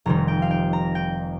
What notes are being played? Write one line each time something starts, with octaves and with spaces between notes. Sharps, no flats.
F1 F2 D#3 G3 A#5
G5
F5
G5
A#5
G5